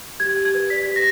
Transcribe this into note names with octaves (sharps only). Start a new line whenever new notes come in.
G4 G#6
G4
G#6
B4
D5 B6
G4
A#6